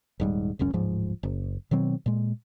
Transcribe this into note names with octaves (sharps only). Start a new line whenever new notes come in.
D#1 G#2 G3
E1 C#2 F#2 C#4
D1 G#2 F3
F#1
B2 D#3 F#3 C4
A#2 G#3